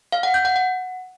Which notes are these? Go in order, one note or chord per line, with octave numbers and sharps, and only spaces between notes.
F5
F#5
G6
F#5
F#5